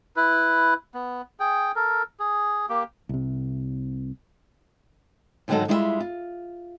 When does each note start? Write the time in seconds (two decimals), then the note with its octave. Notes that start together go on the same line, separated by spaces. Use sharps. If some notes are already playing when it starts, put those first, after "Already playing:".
0.16 E4 B4
0.95 B3
1.40 G#4 G5
1.76 A4 A#4
2.20 G#4
2.69 A#3 G4
3.09 C2 C3
5.48 G#2 D3 D#3 F#3 D#4 A4
5.68 G3 G#3 E4 F4 B4 E5
6.00 F4